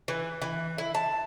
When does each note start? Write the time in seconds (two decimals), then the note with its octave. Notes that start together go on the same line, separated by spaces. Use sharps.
0.08 E3
0.42 E3
0.78 E4
0.95 A5